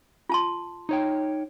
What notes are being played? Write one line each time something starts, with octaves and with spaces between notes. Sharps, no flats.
F4 A5 C6
D#4 C#5 G5